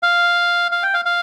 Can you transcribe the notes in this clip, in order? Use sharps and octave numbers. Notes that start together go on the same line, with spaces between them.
F5
F5
G5
F5
F5